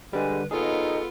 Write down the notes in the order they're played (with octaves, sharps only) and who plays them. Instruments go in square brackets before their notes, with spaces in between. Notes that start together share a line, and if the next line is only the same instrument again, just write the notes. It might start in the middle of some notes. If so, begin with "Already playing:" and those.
[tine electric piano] D3 G3 [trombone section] G#3 [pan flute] B4
[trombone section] D#2 D#4 [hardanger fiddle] B3 F4 [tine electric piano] G#4 [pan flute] A4